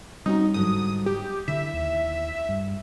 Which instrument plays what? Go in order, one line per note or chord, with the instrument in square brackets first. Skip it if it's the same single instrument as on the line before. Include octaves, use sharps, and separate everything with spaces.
[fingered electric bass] G3 [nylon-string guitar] C4 C#4 F#4 [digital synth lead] D#4
[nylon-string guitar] G#2 D3 F#3 [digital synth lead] D#6
[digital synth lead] G4
[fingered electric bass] D3 [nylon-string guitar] E4 [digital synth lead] E5
[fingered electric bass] D#2
G2